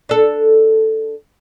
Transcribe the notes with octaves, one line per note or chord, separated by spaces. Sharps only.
D4 A4